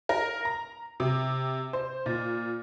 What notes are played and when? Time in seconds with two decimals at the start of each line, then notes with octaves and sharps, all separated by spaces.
0.09 A#4
0.45 A#5
1.00 C3
1.73 C5
2.06 A#2